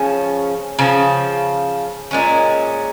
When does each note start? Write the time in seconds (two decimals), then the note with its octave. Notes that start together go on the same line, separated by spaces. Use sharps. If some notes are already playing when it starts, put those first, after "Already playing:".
Already playing: C#3 F3 C#4
0.79 C#3 F3
2.11 A#2 G#3 C#4